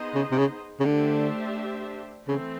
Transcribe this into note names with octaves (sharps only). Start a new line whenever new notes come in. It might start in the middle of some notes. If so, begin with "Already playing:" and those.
Already playing: B3 D#4 G#4 C5 D#5
C#3
C3
C#3
C#3
D3 A3 D4 G4 C5 E5
C#3 E3 A3 C4